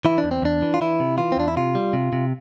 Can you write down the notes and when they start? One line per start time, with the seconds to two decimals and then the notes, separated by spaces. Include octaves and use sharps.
0.05 E3 E4
0.18 D4
0.24 E2
0.31 C4
0.42 E2 D4
0.62 E3
0.74 F4
0.81 E3 E4
1.00 C3
1.18 E3 F4
1.32 C4
1.37 E2 D4
1.48 E4
1.56 C3 F4
1.75 G3
1.93 C3
2.13 C3